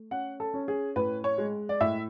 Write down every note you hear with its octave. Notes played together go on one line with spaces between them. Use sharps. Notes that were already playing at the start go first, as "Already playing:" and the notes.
Already playing: A3
C#4 F#5
A4
C#4
G#4
A2 B4
C#5
G#3
D5
A2 E5